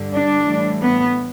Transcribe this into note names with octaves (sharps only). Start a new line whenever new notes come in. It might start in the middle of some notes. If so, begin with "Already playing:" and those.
Already playing: G2 D3 G3
D4
A2 E3 G3
B3